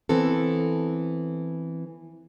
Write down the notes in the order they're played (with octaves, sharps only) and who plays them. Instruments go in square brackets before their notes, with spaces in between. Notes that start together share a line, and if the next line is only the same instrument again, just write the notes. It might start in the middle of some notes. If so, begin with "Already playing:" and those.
[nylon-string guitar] E3 B3 C4 A4